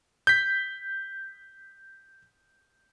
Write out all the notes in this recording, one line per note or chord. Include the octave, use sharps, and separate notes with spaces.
G6 B6